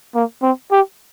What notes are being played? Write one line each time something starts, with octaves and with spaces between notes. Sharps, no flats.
A#3
C4
G4